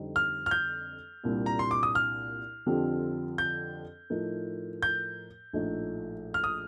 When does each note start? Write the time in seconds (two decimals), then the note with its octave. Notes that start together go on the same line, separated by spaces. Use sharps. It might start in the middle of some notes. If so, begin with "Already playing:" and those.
Already playing: F2 D3 G3 C4 D#4
0.16 F6
0.46 F6
0.51 G6
1.24 C2 A#2 G3 D4 G4
1.46 A#5
1.59 C6
1.71 D6
1.83 D#6
1.95 F6
2.66 F2 D3 F3 C4 G4
3.38 G6
4.10 A2 F3 A3 D#4 A#4
4.82 G6
5.53 A#1 A2 F3 A3 D#4
6.34 F6
6.44 D#6